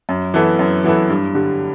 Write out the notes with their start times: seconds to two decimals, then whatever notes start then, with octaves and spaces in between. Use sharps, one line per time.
0.09 F#2
0.34 E3 B3 E4 A4
0.59 F#2
0.84 E3 B3 E4 A4
1.10 G2
1.35 D3 G3